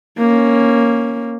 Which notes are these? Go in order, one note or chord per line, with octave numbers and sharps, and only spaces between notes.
A#3 C#4